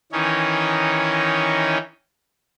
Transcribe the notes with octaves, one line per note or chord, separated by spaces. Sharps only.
D#3 E3 C#4 D#4 C#5